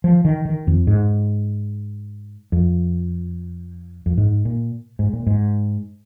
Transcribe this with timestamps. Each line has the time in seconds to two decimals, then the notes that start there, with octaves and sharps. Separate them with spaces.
0.04 F3
0.25 D#3
0.45 D#3
0.67 F2
0.87 G#2
2.52 F2
4.06 F2
4.17 G#2
4.45 A#2
4.99 G#2
5.13 A#2
5.27 G#2